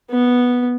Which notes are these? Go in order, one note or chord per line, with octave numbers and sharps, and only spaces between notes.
B3